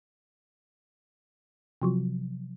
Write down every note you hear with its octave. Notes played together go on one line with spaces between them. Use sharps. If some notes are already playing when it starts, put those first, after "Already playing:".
C3 F3 F#3